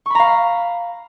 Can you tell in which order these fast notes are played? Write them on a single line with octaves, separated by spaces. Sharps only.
C#6 B5 A#5 F5